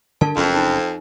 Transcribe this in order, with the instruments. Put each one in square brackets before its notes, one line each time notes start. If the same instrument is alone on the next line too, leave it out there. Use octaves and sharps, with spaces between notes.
[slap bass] G2 D3 [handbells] D4 A#4 A5
[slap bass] F#1 C#4 [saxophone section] F2
[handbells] D#4